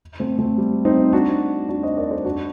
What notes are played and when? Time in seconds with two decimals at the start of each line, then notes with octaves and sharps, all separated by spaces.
0.20 A3 C4
0.39 A3 C4
0.58 G3
0.85 C4 D#4
1.13 D4 F#4
1.69 D4 F#4
1.83 C5 D#5
1.97 A#4 D5
2.11 A4 C5
2.25 D4 F#4